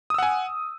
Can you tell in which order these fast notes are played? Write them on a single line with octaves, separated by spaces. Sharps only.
D#6 E6 F#5 G#5